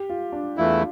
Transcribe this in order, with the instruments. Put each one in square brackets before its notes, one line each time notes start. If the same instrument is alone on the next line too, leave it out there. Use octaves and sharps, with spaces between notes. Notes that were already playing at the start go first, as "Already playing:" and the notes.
Already playing: [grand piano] G4
F4
D4
[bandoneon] E2 E3 A3 E4 [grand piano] F4